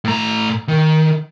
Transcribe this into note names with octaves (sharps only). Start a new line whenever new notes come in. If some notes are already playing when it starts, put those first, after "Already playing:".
A2 A#5
D#3